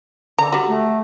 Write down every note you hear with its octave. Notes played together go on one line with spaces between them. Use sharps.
D3 A#5
G3 F#4
A3